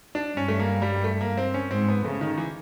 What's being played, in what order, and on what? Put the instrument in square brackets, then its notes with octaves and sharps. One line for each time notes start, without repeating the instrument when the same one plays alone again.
[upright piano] D4
[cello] G2 [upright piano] C#4
[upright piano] A3
A#3
G3
A3
A#3
C4
C#4
[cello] G#2 [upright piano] C4
[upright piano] B3
[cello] C#3 [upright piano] A3
[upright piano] D#3
E3